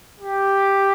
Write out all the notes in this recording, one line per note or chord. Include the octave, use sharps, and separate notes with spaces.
G4